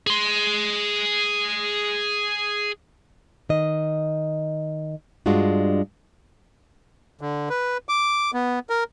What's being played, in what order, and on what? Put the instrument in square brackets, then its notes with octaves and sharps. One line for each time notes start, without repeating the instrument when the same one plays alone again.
[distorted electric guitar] G#4 C6
[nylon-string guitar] D#3 D#5
G2 G#3 D4 F4 F#4
[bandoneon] D3
B4
D6
B3
A#4